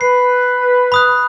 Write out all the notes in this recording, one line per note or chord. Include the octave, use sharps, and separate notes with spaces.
B4 C7
B5 D#6 F#6